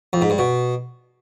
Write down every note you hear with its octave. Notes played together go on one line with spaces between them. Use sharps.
F2
G#2
G2
B2